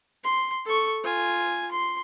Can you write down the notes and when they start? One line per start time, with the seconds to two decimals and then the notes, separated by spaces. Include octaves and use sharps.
0.24 C6
0.66 A4 C#6
1.03 F4 G#5
1.71 C6